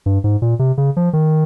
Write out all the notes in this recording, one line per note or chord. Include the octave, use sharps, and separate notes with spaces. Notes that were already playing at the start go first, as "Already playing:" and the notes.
G2
G#2
A#2
C3
C#3
F3
D#3